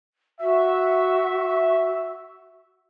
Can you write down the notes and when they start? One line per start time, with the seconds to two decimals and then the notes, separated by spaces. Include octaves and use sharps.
0.40 F#4 E5